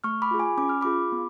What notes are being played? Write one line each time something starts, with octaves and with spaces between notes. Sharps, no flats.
A3 C#6 F6
B5 D6
F4 G#4
G#5 B5
C#4 D6
F6
F4 G#4 B5 D6
B3